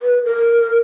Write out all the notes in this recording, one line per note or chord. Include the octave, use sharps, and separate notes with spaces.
B4
A#4